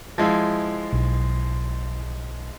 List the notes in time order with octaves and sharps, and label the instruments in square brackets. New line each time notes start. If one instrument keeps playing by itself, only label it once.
[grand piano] F3 G#3 E4
[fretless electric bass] B1